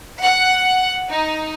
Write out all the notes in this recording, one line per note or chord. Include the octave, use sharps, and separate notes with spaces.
F#5
D#4